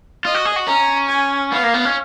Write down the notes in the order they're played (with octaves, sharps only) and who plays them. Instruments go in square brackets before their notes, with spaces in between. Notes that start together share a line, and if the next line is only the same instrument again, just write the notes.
[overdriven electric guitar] F4 [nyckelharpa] D#5
[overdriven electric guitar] F#4
G#4
F#4
[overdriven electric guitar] C#4 [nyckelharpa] A#5
[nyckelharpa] G#5
[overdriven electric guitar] B3 [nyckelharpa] F5
[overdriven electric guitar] A#3
B3
C#4